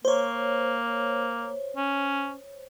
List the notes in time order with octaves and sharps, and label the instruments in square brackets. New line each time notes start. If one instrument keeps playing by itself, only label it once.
[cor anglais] A#3 [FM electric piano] C5 C#5
[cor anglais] C#4